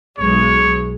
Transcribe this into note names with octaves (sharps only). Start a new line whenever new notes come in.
B1 G#3 C#5